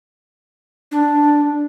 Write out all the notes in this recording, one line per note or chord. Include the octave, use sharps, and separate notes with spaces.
D4